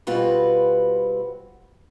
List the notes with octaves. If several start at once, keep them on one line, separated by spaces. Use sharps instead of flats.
B2 G3 C4 F4 F#4 B4